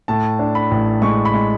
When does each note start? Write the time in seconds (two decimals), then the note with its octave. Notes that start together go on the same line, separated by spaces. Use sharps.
0.08 A2 A5
0.39 D4
0.55 B5
0.71 A1
1.02 G#3 C#6
1.25 B5
1.34 G#3